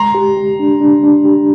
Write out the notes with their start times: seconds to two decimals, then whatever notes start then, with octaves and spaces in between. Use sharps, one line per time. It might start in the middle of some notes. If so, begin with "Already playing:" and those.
Already playing: G#3 A#5 C6
0.15 G4
0.37 G4
0.60 D4
0.80 D4
1.04 D4
1.25 G4